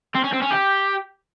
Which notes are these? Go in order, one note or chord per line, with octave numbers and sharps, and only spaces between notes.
C4
C#4
C4
C#4
G4